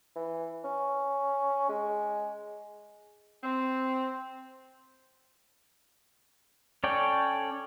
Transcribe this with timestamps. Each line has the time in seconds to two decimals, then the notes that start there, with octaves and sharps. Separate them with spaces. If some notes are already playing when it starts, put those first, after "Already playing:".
0.16 E3
0.64 C#4
1.69 G#3
3.44 C4
6.84 C#4 A4 C#5 D5 G5